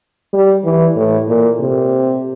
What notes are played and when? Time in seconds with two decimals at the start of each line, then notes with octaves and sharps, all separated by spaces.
0.33 G3
0.64 E3
0.96 A2
1.28 A#2
1.60 C3